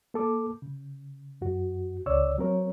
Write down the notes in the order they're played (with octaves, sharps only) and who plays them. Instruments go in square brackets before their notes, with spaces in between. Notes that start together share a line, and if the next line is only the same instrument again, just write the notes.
[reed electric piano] A#3 A4 D6
C#3
F#2 F#4
C#2 C#3 C#5 D5 E6
F#3 C4 A#4 C#5